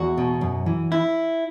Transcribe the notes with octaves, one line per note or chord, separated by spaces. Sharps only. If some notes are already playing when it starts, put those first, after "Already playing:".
Already playing: E2 F#4
B2
F#2
E3
E4